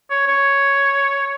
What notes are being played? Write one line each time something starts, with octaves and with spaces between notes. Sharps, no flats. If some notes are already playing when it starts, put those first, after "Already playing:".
C#5
C#5